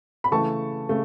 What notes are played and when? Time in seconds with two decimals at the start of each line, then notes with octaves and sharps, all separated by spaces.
0.24 B5
0.31 C#3 E3 A3 A5 C#6
0.89 C#3 A3